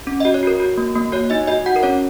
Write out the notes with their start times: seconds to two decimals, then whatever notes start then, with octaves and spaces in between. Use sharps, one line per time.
0.07 C#4
0.20 F#4 D#5
0.34 C#5
0.43 F#4 A#4
0.60 F#4
0.77 A#3
0.95 A#3
1.12 F#4 C#5
1.30 D#4 D#5
1.47 F#4 D#5
1.66 F#4 F#5
1.76 A#4
1.83 C#4 C#5